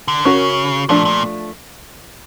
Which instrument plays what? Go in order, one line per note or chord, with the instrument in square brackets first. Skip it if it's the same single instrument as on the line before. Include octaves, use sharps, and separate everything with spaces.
[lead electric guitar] D3
[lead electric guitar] C#3 [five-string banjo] C#4 F#4 A#4
[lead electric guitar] A#2 [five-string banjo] F3 A3 D4
[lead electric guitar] A#2